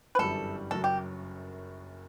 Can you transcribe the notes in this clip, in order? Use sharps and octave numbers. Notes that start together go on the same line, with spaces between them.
B4
G1 F#2 E3 G3 A4
F#1 F#2 F#3 A4
G4